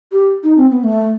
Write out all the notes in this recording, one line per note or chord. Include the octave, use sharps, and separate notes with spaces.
G4
D#4
C4
B3
A3